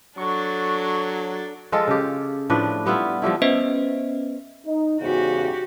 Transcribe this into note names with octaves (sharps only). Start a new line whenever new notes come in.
F#3 D4 A4 C#6
F3 G#3 F4 A4
C#3 G4
A2 F3 D4 B4
G3 B3 E4 F4
F3 G3 A3 E4
B3 C#4 B4 C5 D#5 E5
D#4
E2 G#2 C#3 F#4 G4